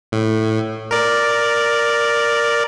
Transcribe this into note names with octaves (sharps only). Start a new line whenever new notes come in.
A2
A#4 D5